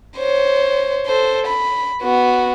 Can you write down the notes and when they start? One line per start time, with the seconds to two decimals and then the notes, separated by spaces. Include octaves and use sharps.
0.17 C5 C#5
1.07 A4 C5
1.47 B5
2.02 B3 F#4